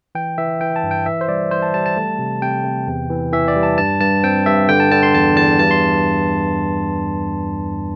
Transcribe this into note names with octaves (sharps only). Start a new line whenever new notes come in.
E3 G5
E3 E5
E3 G5
A5
G2
G5
E3 E5
C5
G3 D5
E3 C5
A5
G3 A5
A5
A3
C3
C3 G5
C3
E2
E3
E3 E5
D5
G3
A5
G2 A5
G2 A5
C4 G5
G2 E5
D3 G5
A5
D3 A5
C6
E2 A5
E2 A5
G2 A5
C6